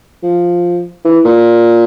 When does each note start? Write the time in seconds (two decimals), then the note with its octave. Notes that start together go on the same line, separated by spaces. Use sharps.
0.23 F3
1.05 E3
1.25 A#2